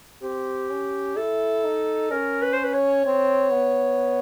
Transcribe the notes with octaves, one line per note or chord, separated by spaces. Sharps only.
C4 G4
C#4
E4 A4
D#4
C#4 A#4
B4
C5
B4
C#5
C4 C#5
B3